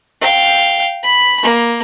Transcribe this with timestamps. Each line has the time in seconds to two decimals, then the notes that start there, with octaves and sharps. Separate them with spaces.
0.21 F5 G5
1.03 B5
1.43 A#3